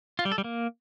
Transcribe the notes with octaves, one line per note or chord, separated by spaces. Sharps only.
F4
G3
A4
G3
A#3